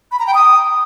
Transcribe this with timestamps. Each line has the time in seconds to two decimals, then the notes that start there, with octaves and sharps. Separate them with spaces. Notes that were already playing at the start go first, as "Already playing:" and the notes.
0.12 B5
0.19 A#5
0.27 G5
0.34 D#6